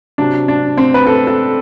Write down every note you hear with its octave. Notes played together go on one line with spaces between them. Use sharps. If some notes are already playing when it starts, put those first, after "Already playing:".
C3 F#3 D4
D4
C4
B4
A4
A4